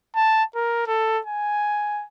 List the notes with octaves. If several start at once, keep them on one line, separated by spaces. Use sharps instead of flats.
A5
A#4
A4
G#5